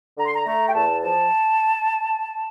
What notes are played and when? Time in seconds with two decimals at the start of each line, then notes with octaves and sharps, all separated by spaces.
0.18 D3 A#5
0.25 C6
0.34 A#5
0.46 A3 A#5
0.69 G5
0.74 E2 A5
1.02 F3 A5